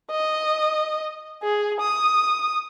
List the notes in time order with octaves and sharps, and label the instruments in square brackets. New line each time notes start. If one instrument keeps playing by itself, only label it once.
[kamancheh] D#5
G#4
D#6